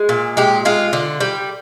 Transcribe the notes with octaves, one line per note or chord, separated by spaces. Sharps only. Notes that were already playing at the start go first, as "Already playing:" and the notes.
Already playing: G#3
A#2
G#3 G4
G#3 F4
D3
G3